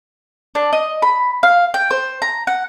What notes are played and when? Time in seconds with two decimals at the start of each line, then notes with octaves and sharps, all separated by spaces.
0.55 D4
0.73 D#5
1.02 B5
1.43 F5
1.74 G5
1.91 C5
2.22 A#5
2.47 F#5